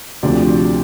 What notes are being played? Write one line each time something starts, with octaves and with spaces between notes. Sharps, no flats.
D2 C3 F3 D4 D5